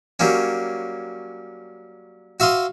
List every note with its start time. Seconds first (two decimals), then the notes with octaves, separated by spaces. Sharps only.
0.20 F#3 G3 A#3 C#4
2.40 F#4 E5 F5 C6 D#6